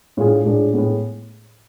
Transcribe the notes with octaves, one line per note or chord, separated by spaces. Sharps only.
A2 G#3 D4 F4 G#4
A2 G#3 D4 F4 G#4
A2 G#3 B3